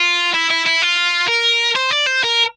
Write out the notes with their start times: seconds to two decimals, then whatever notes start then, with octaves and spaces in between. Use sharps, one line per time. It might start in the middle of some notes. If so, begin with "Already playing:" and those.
Already playing: F4
0.34 E4
0.51 E4
0.66 E4
0.82 F4
1.28 A#4
1.76 C5
1.91 D5
2.07 C5
2.24 A#4